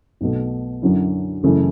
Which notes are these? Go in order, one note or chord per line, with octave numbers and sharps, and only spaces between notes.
B1 B2 A3
F#2 D3 F#3 C#4 E4
F#1 F#2 C#3 E3 A3